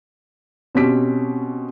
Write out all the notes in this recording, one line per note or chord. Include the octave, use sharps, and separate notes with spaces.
B2 C4 C#4 G4 B6 D7